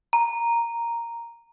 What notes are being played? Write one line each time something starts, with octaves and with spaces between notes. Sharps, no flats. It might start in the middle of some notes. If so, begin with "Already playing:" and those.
A#5